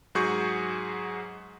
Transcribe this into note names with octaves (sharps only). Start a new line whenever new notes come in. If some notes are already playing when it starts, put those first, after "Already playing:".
G#2 F#3 F#4 G#4 C#6 G6